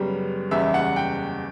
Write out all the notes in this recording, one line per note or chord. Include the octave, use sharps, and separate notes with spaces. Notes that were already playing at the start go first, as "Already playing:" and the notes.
Already playing: F#2 C#3 G3 B3
F#1 E2 C#3 G3 E5
F#5
G5